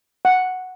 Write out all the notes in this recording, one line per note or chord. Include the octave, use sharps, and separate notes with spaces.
F#5